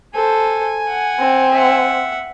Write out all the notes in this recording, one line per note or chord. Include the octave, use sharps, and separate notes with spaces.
A4 C5 G#5
F#5
C4
E5 F#5